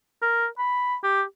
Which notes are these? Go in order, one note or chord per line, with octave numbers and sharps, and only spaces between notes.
A#4
B5
G4